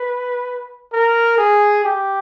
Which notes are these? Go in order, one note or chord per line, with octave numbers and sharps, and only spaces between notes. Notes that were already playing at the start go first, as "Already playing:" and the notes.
Already playing: B4
A#4
G#4
G4